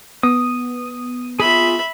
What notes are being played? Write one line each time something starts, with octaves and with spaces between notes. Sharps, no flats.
B3 D#6
F4 G#4 E5 B5